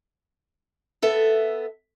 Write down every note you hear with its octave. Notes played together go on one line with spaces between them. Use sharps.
B3 A4 E5